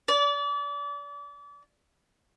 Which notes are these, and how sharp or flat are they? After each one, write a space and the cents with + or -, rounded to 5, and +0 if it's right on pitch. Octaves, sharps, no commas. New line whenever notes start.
D5 -35